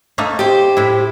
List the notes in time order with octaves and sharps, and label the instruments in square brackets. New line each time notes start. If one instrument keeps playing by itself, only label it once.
[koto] A3 A#3 D#4
[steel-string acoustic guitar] G4 C5
[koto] A2 E4